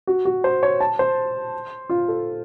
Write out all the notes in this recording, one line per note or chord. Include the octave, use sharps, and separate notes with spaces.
F#4
F#4
C5
C#5
A5
C5
F4
A4